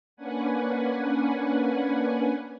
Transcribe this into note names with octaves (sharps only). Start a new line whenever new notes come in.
A#3 C#4 D4 B4 F#5 G#5